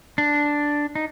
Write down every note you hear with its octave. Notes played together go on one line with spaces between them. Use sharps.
D4
D#4